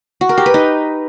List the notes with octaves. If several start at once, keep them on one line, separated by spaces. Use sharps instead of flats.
F#4
A#4
G4
B4
D#4